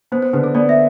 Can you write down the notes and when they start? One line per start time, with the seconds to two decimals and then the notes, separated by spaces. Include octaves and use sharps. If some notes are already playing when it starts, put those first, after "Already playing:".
0.12 B3 C5
0.22 C5
0.33 D3 B4
0.44 A4
0.55 B3 D5
0.69 E5